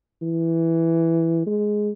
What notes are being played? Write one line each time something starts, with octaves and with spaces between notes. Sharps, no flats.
E3
G#3